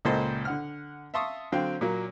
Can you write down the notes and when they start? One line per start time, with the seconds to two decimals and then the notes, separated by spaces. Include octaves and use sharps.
0.05 C#2 A#2 A4 C5 D#5 C6
0.45 D3 F#5 F6
1.14 E5 F5 A5 C6 C#6 D#6
1.52 D3 F#3 C4 F5 G5
1.81 A#2 F#3 A#3